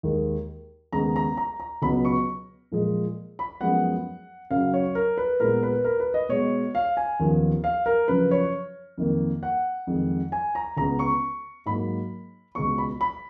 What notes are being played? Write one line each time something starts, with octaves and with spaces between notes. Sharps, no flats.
D#2 D#3 G#3
D#2 C#3 G#3 B3 A#5
A#5
A#5
A#5
C#2 B2 F#3 B3 B5
C#6
A#2 F3 G#3
B5
F#2 F3 G#3 B3 F#5
F#2 C#3 F#3 F5
C#5
A#4
B4
A#2 G#3 B3 A#4
B4
A#4
B4
D#5
B2 G#3 B3 C#5
F5
G#5
D#2 C#3 F3 B3
F5
A#4
F#2 C#3 F3 B4
C#5
F2 D#3 A#3
F#5
F2 D#3 G#3
G#5
A#5
C#2 C#3 G#3 B3 A#5
C#6
G#2 F#3 A#3 B5
C#2 B2 G#3 B3 C#6
B5
B5